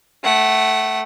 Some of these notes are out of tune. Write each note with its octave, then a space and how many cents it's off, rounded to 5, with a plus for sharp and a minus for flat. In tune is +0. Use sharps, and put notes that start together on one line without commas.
A3 -5 F#5 +30